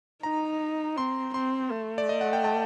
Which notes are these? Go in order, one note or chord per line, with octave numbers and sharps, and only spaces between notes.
D#4 A#5
C4 C6
C4 C6
A3
D5
D#5
F#5
G5
A5